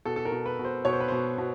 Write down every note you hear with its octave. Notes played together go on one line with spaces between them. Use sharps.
B2 A4
A4
A#4
B2
B4
B2
C5
B2 C#5
C5
B4
B2 C5
B2